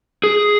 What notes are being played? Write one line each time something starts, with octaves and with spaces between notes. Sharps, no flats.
G#4